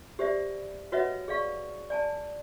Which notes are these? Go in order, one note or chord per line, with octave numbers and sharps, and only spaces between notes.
G4 C5 D5 E5
F#4 B4 C#5 D#5 E5 F#5
G#4 D5 F5 C#6
D5 G#5 A5